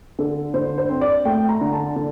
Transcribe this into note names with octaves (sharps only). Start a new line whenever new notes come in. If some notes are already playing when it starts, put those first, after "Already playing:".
D3 A4
D3 C5
C5
C4
D5
A3 G5
A#5
D3
A5
D3